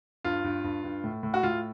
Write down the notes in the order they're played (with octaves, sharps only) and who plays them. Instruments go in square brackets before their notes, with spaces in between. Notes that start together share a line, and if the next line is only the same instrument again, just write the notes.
[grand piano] G2 F4
G2
G2
G2
A2
A2
F#4
A2 F4